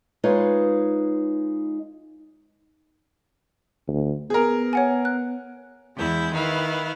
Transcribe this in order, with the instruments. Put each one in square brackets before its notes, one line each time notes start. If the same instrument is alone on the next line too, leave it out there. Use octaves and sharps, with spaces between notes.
[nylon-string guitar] G#3 D#4 F4 B4 C#5
[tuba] D2
[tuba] B3 [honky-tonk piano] G#4 A#4
[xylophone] C#5 F#5 G#5
F#6
[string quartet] E2 G#3 E4 G6
D#3 E4 B4 F5